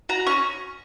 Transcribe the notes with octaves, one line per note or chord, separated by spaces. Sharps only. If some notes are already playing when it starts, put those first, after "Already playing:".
F#4 A#5
C#4 C#6